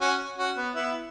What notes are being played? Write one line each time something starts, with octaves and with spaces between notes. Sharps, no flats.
C#4 F#4
C#4 F#4
B3
B3 E4